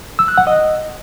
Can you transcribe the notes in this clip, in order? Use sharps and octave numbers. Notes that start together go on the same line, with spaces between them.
E6
F#6
F#5
D#5